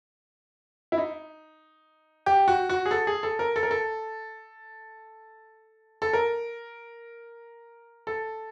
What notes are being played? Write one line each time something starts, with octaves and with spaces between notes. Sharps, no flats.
E4
D#4
G4
F#4
F#4
G#4
A4
G#4
A4
A#4
A4
A#4
A4
A4
A#4
A4